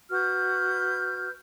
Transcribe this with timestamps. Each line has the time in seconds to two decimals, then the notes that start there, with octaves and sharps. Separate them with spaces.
0.10 F#4 B4 F6 G6